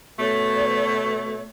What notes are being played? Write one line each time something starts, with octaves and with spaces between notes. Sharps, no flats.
B2 A3 C#5